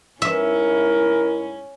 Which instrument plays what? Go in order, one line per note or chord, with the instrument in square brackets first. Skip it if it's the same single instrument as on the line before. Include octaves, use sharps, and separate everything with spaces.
[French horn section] G#2 E4 [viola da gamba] C#4 [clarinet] A#4 [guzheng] E5